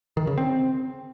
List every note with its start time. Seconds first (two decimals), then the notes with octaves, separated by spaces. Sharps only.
0.17 D#3
0.27 C#3
0.38 C4